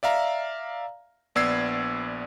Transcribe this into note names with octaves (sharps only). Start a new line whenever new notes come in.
D5 E5 F5 A#5
A#1 B3 D5 E6 G#6 C7